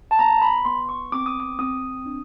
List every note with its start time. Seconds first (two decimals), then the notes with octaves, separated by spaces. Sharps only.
0.11 A5
0.19 B3 A#5
0.42 B5
0.65 B3 C6
0.89 C#6
1.12 C4 D6
1.26 D#6
1.40 D6
1.59 C4 D#6
2.06 D4